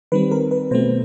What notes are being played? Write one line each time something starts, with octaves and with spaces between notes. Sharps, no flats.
D#3 G3 C4 B4
A#4
B4
B2 F#3 A3 C4 C5